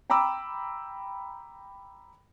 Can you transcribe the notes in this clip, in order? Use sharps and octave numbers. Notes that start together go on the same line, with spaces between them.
G5 A#5 B5 D6 E6